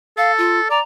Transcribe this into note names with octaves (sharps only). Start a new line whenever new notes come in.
A4 F5
F4
D5 A#5